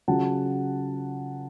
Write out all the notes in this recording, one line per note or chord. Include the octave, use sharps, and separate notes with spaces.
C#3 F#3 C#4 F4 F#5 A5